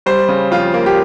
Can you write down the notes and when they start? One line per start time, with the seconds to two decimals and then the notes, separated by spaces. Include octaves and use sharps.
0.06 G3 C5
0.28 C#3
0.51 F2 F4
0.74 A#3
0.86 G4